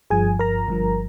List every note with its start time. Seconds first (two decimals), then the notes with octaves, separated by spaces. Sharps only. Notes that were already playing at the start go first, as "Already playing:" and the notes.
0.10 G1 G2 F3 G#4 G#5
0.39 A#4 A#5
0.68 G1 G2 F3